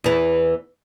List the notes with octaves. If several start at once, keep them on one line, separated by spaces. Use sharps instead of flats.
E2 E3